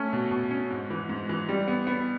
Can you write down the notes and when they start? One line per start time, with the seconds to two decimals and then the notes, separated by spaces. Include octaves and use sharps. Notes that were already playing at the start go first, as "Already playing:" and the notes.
Already playing: A3 C#4
0.13 B2
0.31 B2
0.51 C#4
0.70 G#2
0.90 E3
1.09 G#2
1.29 E3
1.49 G3
1.68 B3
1.87 B3